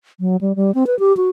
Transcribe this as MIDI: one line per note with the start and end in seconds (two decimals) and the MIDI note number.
0.20 0.37 54
0.41 0.56 55
0.56 0.74 55
0.75 0.87 60
0.87 0.98 71
0.99 1.15 67
1.17 1.29 66